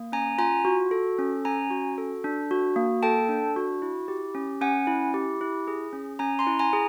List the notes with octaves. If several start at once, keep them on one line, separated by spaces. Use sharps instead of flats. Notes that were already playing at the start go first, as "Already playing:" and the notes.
Already playing: A#3
C#4 G#5 A#5
F4 G#5 A#5
F#4
A4
C#4
C#4 G#5 A#5
F#4
A4
D4
F#4
A#3
A4 G5 A5
D4
F#4
E4
G4
C#4
C#4 F#5 G#5
E4
G4
E4
G#4
C#4
C#4 G#5 A#5
A#5 C6
E4
G#5 A#5
G#4